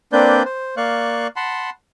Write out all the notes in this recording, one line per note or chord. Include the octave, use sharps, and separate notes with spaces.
A#3 C4 D4 B4 D5 G6
C5
A#3 D5 F5 C#6 F#6
F#5 A5 B5 C6